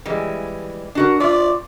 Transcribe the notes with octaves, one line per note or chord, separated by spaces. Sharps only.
E3 G3 G#3
D4 F#4 A#4
F4 D5 E5